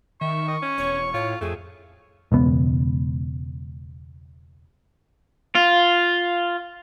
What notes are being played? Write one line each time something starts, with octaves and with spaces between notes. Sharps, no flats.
D#3 E5 C#6
D#5
C#4
E1 C#5
A2 F4 C#5
F2 A3 G#4
E1 C#2 B3
F4